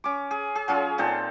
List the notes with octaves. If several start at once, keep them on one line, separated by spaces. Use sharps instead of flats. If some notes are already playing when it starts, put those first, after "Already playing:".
C#4 D6
G#4
G#4
F#3 C#4 F4 G#4
A#2 C4 D#4 A4